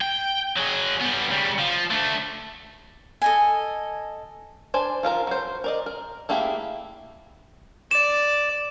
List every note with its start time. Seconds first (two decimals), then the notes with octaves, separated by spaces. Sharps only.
0.01 G5
0.57 F#3 G#4
1.01 G3 B3
1.31 C#3 G3
1.59 F3
1.91 A3 D4
3.22 A4 D#5 G#5
4.74 D4 C5 D5 G#5
5.03 F3 F4 A#4 A#5
5.27 F#3 C5
5.64 A#4 D5 D#5
5.86 A#4
6.29 A3 A#3 E4 G4 G#4
7.91 D5 E7